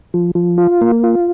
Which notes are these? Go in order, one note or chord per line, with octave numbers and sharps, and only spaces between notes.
F3
F3
F4
A#3
F4